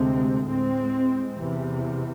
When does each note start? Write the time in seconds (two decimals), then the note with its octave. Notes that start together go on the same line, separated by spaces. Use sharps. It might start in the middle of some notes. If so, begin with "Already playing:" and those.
Already playing: D2 C3 G#3 C4
0.47 A2 G#3 C4
1.38 E2 C3 E3